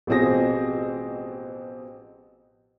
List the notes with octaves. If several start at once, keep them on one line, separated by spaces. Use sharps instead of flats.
A1 B2 F3 C4 G#4 A#6